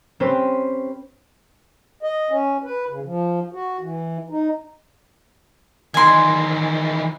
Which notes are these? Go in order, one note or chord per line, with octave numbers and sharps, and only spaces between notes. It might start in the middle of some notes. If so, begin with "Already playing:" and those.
C4 C#4 G4 B4 C5
D#5
C#4
B4
C#3
F3
F#4
E3
D#4
D#3 E3 G#5 C6